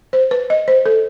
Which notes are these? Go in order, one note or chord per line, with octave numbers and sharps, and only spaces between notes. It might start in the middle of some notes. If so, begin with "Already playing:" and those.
C5
B4
D#5
C5
A4